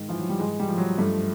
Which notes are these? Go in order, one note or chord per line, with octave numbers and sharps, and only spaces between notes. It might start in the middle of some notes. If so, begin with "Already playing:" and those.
Already playing: G#2 D#3
E3 F3
F#3
G3
G#2 G#3
G3
F3
F#3
G2 A3